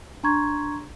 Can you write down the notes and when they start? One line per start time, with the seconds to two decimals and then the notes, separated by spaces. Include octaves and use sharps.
0.23 D4 A#5 C6 C#6 G#6